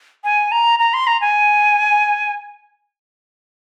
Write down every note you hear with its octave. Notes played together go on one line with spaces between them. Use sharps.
G#5
A#5
A#5
C6
A#5
G#5